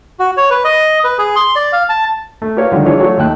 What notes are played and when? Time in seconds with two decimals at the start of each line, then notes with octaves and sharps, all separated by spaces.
0.19 F#4
0.37 C#5
0.51 B4
0.64 D#5
1.04 B4
1.18 G#4
1.36 C6
1.56 D5
1.73 F5
1.89 A5
2.42 A3
2.56 F4 G4 A#4 B4 C#5 F5
2.72 D3 D#3 F3 G3
2.85 E3 D4 F4 G4 G#4 C#5
3.00 F#3 A3 F4 F#4 C#5
3.18 D#2 A3 G5 A5 F#6